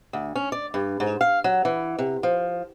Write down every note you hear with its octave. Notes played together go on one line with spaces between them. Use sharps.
D2
C#4
D5
G2
G#2
F5
F#3
E3
C3
F3